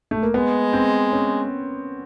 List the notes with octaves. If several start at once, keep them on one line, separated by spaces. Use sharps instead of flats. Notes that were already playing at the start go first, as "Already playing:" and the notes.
A3
A#3
G#3 B3
C4
C#4